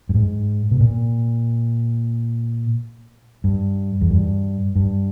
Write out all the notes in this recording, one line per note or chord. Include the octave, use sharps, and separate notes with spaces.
G2
G#2
B2
A#2
G2
E2
G2
G2